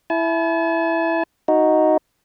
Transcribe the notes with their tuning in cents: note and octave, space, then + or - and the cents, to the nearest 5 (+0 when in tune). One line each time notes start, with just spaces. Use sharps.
E4 +5 A5 -45
D#4 +0 F#4 +0